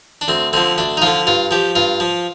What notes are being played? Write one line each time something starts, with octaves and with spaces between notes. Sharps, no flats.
D4
D2 C4
D3 F3 C4
D2 D4
D#4
D3 F3 F4
G2 F4
F3 G4
G2 F4
F3